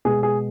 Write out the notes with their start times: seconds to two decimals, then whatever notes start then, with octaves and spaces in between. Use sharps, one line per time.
0.05 B2 G#3 G#4
0.23 G#4